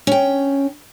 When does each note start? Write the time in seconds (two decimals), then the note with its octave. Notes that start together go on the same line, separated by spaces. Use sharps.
0.07 C#4 G5